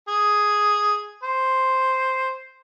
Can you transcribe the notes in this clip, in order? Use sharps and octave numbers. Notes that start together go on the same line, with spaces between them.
G#4
C5